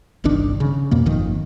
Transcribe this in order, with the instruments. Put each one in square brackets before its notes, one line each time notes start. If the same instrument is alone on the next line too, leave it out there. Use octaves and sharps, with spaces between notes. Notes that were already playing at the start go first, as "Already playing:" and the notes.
[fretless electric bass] G1 C2 D#3 D4
C#3
F2 B2 A#3
G1 F2 D#3